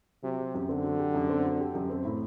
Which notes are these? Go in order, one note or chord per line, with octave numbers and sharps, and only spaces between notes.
C3 F#3
G4
F#2
D3 C4
F#3
G4
F#2
C4
F#3
G4
F#2
C4
A2